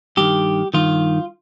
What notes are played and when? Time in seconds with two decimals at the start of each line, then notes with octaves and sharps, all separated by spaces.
0.17 G2 D#3 G4
0.74 G2 D#3 F4